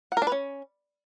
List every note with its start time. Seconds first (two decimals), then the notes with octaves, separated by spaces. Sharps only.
0.12 F#5
0.17 A#4
0.22 D4
0.27 B4
0.32 C#4